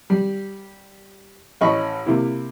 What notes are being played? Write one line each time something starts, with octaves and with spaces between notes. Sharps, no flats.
G3
A1 C#4 D#5 B5 C#6
C3 A#3 E4